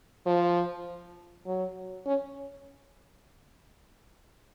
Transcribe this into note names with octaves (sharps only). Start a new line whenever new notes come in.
F3
F#3
C#4